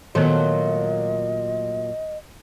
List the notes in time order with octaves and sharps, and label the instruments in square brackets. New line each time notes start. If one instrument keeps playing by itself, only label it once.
[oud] A#2 F#3 A3 [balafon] D#3 B3 [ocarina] D#5